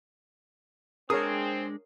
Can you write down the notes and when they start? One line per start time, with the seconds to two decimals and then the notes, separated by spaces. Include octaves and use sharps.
1.10 G#3 C4 D4 G#4 A#4 C#5 D#6